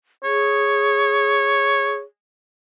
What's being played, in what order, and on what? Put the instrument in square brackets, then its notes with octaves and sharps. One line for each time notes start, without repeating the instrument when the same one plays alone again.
[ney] G#4 [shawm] C#5